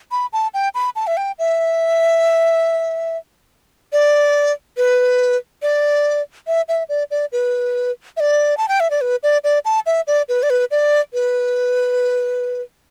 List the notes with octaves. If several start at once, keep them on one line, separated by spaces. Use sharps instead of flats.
B5
A5
G5
B5
A5
E5
G5
E5
D5
B4
D5
E5
E5
D5
D5
B4
E5
D5
A5
G5
E5
D5
B4
D5
D5
A5
E5
D5
B4
D5
B4
D5
B4